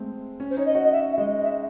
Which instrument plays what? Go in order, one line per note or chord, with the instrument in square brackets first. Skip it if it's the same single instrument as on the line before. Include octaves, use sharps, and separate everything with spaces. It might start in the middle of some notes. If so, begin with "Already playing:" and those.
Already playing: [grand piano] G#3 A3 C4
C#4
[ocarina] C5
[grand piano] D#4 [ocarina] C#5
[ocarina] D#5
[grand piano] F#4
[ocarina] D#5
E5
E5
[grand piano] G#3 [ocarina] D#5
[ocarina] D#5
E5